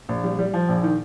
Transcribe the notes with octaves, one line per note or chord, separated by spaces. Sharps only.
A#1
G3
G3
F3
A#1
D#3